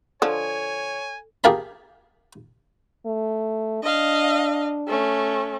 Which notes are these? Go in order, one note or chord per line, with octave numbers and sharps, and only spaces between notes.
D3 F3 A4 C#5 G#5
G4 G#4 A#4 F5 A5 B5
A3
D4 D#5 F5
A3 C#4